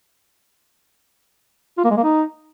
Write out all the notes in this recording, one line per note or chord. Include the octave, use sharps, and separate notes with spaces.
F4
A#3
G#3
A#3
D#4